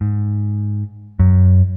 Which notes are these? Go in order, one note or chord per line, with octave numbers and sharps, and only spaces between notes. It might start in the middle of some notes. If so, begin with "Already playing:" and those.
G#2
F#2